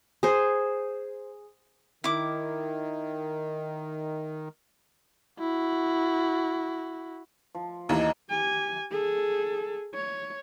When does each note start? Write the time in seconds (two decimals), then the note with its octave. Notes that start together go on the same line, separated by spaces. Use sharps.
0.23 G#4 C5
2.04 D#3 E4 D6
5.39 E4 F#4
7.55 F3
7.89 D#2 E3 D#4 G#4 A#5
8.30 G4 G#5
8.90 G#4 A4
9.94 C#5